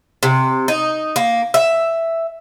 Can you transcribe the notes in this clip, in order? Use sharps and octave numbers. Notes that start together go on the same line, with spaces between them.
C3
D#4
A#3
E5